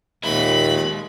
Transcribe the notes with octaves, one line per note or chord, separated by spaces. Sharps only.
D#2 A#2 G#3 E5 B5